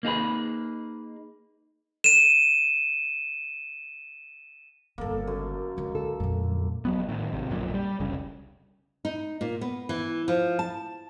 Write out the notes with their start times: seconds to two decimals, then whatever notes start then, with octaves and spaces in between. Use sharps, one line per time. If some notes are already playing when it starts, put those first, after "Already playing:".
0.03 A#3 D#4 G#4 B4
2.04 D#7 E7
4.98 G1 C#3 A#3 A4
5.27 F#2
5.77 C#2 D3
5.95 A4
6.20 F2 A#2 D3 F#3 A3
6.85 D#1 F#3 B3
7.09 A2 D#3
7.32 G#1 C3
7.49 D1 A#1 F#2 A#2
7.74 G3
8.00 F1 C2 C#3
9.05 D#4
9.41 A#2
9.61 B3
9.89 E3
10.28 F3
10.59 A5